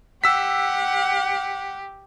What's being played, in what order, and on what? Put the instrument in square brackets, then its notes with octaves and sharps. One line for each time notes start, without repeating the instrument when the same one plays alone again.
[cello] G4 [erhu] F#5 [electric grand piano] E6 B6